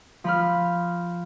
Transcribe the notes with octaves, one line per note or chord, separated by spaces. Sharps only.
F3 B5 F6